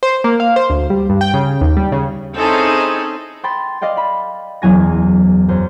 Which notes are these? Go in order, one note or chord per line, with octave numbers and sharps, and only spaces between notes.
C5
A#3
F5
C5
D2
G3
G2
G5
C#3
D#2
G3
C#3
C4 C#4 D#4 E4 G#4 A4
G5 B5 C6 A6
D5 D#5 F5 G5
B5
F#1 E2 F#3 G#5 A#6
F#2 C5